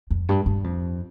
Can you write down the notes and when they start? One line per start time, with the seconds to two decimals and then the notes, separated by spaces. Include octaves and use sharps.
0.11 F2
0.29 G2
0.46 G2
0.64 F2